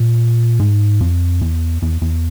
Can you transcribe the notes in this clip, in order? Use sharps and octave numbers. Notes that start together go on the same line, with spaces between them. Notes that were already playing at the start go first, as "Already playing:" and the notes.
Already playing: A#2
G#2
F2
E2
E2
E2